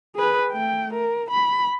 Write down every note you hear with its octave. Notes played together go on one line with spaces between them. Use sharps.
G#4 B4
A3 G5
A#4
B5